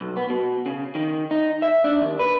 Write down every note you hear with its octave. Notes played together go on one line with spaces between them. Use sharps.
B1
B3
B2
C#3
D#3
D#4
E5
D4
D#2
B4